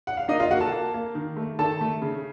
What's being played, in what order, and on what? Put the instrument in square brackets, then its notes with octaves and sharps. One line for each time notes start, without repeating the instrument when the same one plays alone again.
[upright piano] F#5
F5
A#3 D#4 D#5
F4 F5
A#3 F#4 F#5
A4 A5
A#3
A#3
D#3
A3
D#3 A4 A5
A3
C#3